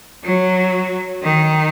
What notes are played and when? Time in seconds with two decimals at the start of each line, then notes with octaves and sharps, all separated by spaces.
0.24 F#3
1.23 D#3